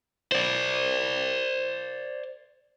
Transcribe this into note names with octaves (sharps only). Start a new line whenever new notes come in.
C5 D5